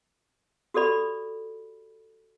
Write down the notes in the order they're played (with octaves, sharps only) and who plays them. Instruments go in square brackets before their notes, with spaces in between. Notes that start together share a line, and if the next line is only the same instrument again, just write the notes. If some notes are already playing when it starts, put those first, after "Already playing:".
[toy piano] F#4 G4 A4 D5 B5